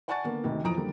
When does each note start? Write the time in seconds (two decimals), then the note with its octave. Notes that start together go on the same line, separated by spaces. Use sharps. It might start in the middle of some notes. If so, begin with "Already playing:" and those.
0.08 D5 F#5 G#5 A5 C#6 A6
0.24 D3 A#3 B3
0.44 D2 C3 D#3
0.64 F2 E3 F3 A#5 D#6 D7
0.77 D3 G3 A#3